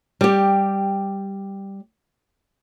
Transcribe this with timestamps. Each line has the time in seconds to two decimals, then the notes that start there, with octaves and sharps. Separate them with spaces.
0.21 G3 G4